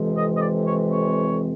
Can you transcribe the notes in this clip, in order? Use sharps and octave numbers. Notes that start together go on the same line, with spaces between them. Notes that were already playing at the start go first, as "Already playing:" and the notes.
Already playing: F2 C3 E3 G#3
D#5
D#5
D5
C#5
C#5